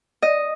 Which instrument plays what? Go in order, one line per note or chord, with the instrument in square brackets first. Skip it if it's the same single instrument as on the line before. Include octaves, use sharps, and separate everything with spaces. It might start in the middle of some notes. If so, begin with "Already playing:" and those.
[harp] D#5